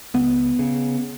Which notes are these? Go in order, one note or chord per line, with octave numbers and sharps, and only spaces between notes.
C#2 B3
C#3